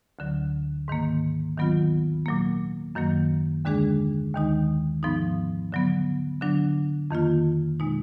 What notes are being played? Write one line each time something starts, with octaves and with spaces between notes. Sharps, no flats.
D2 D3 F#3
G#2 D#3 A#3
D#2 D#3 F#3 B3 F4
A#2 F#3 A#3
F#2 D#3 F#3 A#3
D#2 D3 G#3 D4 G#4
D#2 D#3 G#3 D#4
G#2 F3 B3 D#4
D3 F#3 B3
D3 F#3 D4
F2 D#3 A#3 F4
B2 G#3 D#4